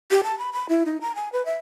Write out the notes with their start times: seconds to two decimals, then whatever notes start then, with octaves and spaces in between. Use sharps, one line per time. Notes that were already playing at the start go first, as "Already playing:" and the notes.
0.11 G4
0.24 A5
0.39 B5
0.53 B5
0.69 E4
0.86 D#4
1.01 A#5
1.15 G#5
1.33 B4
1.46 E5